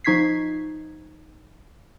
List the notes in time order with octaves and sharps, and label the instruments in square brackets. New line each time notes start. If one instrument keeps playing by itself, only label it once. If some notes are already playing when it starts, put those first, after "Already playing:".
[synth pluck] F3 D#4 C#6 G#6 B6 C7